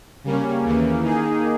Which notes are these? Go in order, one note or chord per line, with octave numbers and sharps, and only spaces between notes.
C#3 G3 A#3 C#4
D#2 C#3 E3 A#3
D#3 A#3 D#4 G#4